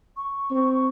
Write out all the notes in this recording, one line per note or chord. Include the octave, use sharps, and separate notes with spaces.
C#6
C4